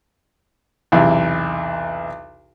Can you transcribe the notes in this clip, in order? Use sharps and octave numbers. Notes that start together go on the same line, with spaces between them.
B1 E2 C3